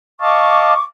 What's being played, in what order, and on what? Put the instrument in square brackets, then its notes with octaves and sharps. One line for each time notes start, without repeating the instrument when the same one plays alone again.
[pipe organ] D#5 F5 A5 [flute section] C#6 D6